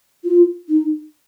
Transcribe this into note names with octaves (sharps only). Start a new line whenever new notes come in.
F4
D#4